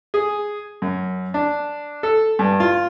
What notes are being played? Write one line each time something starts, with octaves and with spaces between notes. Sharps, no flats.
G#4
F#2
D4
A4
G2
F4